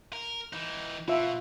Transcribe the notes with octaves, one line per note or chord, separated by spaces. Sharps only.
A#4
E3 D#4
B2 F4 E5